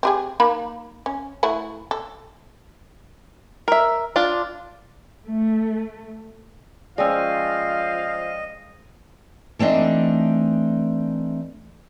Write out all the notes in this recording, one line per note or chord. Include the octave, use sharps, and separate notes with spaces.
C4 G4 G#4
A#3 D#4 B5
C#4
A3 E4 F#4
A4
A#4 E5
D4 F4
A3
F3 G#3 C#4 D5 D#5 F5 G5 E6
E3 A3 C4 D4 D#4